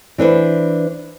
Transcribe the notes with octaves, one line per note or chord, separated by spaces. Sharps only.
E3 D4 B4 C5